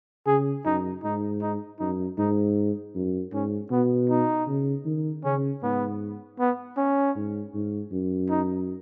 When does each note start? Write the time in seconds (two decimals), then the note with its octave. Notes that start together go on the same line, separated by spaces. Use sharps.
0.26 C#3 G#4
0.65 F#2 D#4
1.04 G#2 D#4
1.41 D#4
1.79 F#2 D#4
2.18 G#2 D#4
2.95 F#2
3.33 G#2 C#4
3.71 B2 B3
4.10 D#4
4.47 C#3
4.85 D#3
5.24 C#3 C#4
5.63 G#2 B3
6.40 B3
6.77 C#4
7.16 G#2
7.54 G#2
7.92 F#2
8.30 D#4